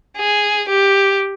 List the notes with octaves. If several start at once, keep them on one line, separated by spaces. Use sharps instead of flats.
G#4
G4